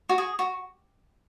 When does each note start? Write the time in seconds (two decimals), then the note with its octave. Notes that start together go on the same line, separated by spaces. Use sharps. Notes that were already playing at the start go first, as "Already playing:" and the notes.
0.09 F#4
0.18 G#4
0.39 F#4